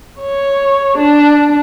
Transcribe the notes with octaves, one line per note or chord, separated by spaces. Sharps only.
C#5
D4